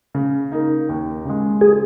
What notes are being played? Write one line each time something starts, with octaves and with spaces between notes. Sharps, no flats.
C#3
A#3 D#4
D#2
C#3 G#3
G#4